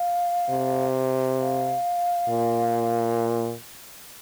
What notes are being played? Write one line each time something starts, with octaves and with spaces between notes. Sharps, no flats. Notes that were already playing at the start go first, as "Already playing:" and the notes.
Already playing: F5
C3
F5
A#2